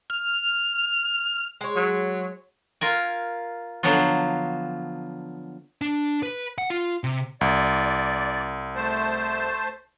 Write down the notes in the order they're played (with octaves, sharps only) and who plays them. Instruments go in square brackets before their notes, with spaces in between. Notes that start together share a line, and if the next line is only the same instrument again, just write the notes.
[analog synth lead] F6
[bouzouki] G#3 C#5
[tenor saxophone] F#3
[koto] F4 A#4 G#5
D3 F3 F#3 B3 F4
[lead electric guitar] D4
B4
F#5
F4
C3
[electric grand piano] C2 [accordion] D5
[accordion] A3 C5 A5